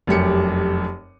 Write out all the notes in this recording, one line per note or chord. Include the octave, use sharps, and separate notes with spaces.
F1 F#2 G4 C#7